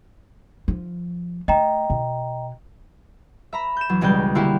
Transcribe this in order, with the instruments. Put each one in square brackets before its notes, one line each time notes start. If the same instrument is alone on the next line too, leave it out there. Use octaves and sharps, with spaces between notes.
[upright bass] F3
[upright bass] A3 [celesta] D#5 G5 A#5
[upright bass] B2
[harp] E5 A#5 B5
G6 E7
E2 F#3
E1 C#2 G3 D5 G6
D3 A#3 E4 F#4 G4